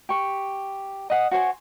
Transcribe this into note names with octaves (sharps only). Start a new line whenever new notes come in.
G4 C#6
D#5 F#5 D#6
F#4 C5 C#5 G#5